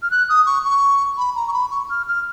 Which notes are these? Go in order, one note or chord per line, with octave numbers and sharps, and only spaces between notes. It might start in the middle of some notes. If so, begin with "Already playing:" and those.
F6
F#6
D#6
C#6
C#6
B5
A#5
C#6
B5
C#6
F6
F6